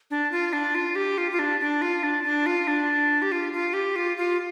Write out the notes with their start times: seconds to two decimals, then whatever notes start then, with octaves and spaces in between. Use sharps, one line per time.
0.11 D4
0.32 F4
0.53 D4
0.75 F4
0.95 G4
1.18 F4
1.31 F4
1.39 D4
1.60 D4
1.82 F4
2.03 D4
2.24 D4
2.46 F4
2.68 D4
3.22 G4
3.32 F4
3.53 F4
3.73 G4
3.96 F4
4.17 F4